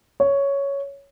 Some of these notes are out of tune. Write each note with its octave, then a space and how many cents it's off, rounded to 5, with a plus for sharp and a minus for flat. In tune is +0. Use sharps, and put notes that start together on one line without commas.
C#5 +5